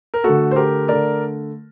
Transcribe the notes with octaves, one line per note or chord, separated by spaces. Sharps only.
A#4
D3 A3 F#4 A4
C5
G4 A#4
D3 A3 A#4 D5